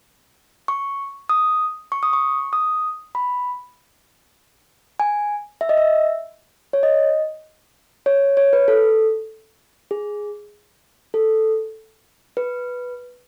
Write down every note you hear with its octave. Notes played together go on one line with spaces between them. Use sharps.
C#6
D#6
C#6
D#6
C#6
D#6
B5
G#5
E5
D#5
E5
C#5
D#5
C#5
C#5
B4
A4
G#4
A4
B4